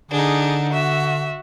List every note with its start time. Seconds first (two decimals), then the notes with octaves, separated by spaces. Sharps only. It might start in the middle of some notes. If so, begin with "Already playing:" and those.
0.11 D3 D4 D#4 G#4
0.73 F#4 E5